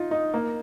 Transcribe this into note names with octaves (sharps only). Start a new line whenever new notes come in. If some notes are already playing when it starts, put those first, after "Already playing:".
Already playing: D#4 F4
D#4
A#3